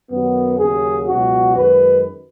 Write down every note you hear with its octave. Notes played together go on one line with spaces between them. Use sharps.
F#2 D#3 F#3 B3
D#2 C#3 F#3 G#4
C#2 B2 F#3 F#4
F#2 D#3 G#3 B4